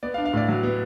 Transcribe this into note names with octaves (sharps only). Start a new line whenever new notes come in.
B3 D5
F5
D4
F5
A2 D5
F#3
B3